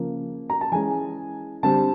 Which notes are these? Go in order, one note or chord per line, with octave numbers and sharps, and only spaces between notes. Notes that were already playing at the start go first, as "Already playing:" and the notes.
Already playing: C#3 F3 A#3
A#5
A5
E3 G#3 C#4 G#5
D3 G3 C4 A5